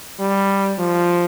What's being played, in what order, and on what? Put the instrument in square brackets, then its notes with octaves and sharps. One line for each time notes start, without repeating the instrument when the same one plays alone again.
[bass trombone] G3
F3